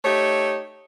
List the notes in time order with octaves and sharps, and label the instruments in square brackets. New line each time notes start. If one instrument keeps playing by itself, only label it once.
[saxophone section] A3 D#4 G4 C#5